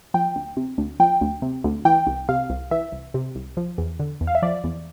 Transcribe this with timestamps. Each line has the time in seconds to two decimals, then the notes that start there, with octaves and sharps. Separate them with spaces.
0.14 F3 G5
0.36 D2
0.57 C3
0.78 D2
1.00 F3 G5
1.21 D2
1.42 C3
1.64 D2
1.85 E3 G5
2.07 C2
2.29 C3 F5
2.50 C2
2.71 E3 E5
2.92 C2
3.14 C3
3.35 C2
3.57 F3
3.78 E2
4.00 D3
4.21 E2
4.27 F5
4.35 E5
4.42 F3 D5
4.64 E2